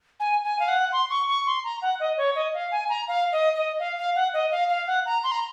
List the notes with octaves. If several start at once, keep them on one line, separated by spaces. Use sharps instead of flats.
G#5
G#5
F5
F#5
C6
C#6
C#6
C6
A#5
F#5
D#5
C#5
D#5
F5
G#5
A#5
F5
D#5
D#5
F5
F5
F#5
D#5
F5
F5
F#5
A#5
C6
A#5